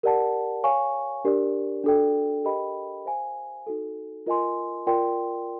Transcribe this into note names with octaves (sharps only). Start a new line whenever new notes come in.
G4 A#4 D5 F#5 A5
C#5 F5 G#5 C#6
D4 G4 A#4 D5
D4 F#4 A4 D5 G5
G4 A#4 D#5 G5 B5
C5 F5 G#5
D#4 F#4 A4
F4 A#4 D#5 G#5 C6
F4 A#4 D5 G5 C6